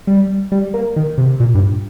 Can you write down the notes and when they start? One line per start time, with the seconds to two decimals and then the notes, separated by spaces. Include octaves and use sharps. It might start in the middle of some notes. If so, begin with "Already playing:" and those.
0.07 G3
0.52 G3
0.74 A#3
0.96 D#3
1.18 C3
1.40 A#2
1.55 G2